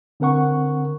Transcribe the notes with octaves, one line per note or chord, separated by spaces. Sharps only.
D3 C4 A#4 F#5 C#6